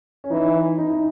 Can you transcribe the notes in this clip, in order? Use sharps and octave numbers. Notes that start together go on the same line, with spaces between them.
C#4
E3 D#4
D#4
D#4